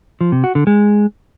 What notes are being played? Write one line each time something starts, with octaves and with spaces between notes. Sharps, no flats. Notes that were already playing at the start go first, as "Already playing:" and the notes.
F3
C3
F#4
D3
G#3